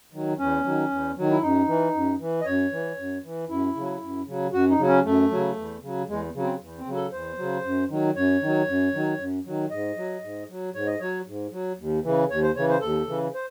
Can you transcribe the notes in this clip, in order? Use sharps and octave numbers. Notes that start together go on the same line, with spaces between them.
D#3 F#3
E2 C#4
D#3 F#3
E2
D#3 F#3
E4
F#2 D#4
E3
F#2
E3
D#5
F#2 C#5
E3
F#2
E3
F#2 E4
C#3 F#3
F#2
C#3 F#3
F#2 F#4
D#4
C#3 F#3
C#4
F#2 A3
C#3 F#3
E2
C#3 F#3
E2 G#3
C#3 F#3
C4
E2
C4
C#3 F#3
A4
E2 C5
C#3 F#3
F#2
D#3 F#3
F#2 C#5
D#3 F#3
F#2
D#3 F#3
F#2
D#3 F#3
G#2 D#5
F#3
G#2
F#3
G#2 C#5
D#5
F#3 C#5
G#2
F#3
D#2
C#3 E3
D#2 C#5
C5
C#3 E3 C#5
C5
D#2 A4
C#3 E3
C5